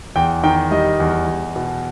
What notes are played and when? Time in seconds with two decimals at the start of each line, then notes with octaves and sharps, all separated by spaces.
0.16 E2 G5
0.43 D#3 G5
0.71 G3 D#5
1.00 E2
1.27 E2
1.56 B2